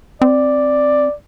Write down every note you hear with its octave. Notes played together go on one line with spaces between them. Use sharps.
C4 D5